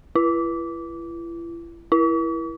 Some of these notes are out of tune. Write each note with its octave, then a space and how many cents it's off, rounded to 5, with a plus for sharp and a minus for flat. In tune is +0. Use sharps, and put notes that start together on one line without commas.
E4 +40
E4 +10